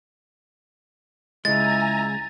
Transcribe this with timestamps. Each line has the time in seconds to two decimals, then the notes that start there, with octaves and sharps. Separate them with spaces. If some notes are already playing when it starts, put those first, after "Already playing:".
1.45 C#2 G#3 E4 G#5 A#5 A6